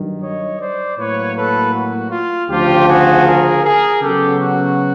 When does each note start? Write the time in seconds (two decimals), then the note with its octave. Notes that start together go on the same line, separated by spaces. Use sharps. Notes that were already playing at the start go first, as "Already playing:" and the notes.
Already playing: G2 D#3 F#3
0.22 C#5 D#5
0.60 C5 D5
0.97 A2 F#3 A#3 B4 C#5
1.36 A4 B4
1.74 F#4
2.11 F4
2.49 D2 C#3 F3 F4 G4
2.88 F#4 G#4
3.25 G#4 A#4
3.64 G#4 A#4
4.01 C#3 F#3 B3 G4 A4
4.39 F#4